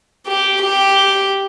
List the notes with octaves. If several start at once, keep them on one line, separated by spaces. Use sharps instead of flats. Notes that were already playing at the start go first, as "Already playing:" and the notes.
G4
G4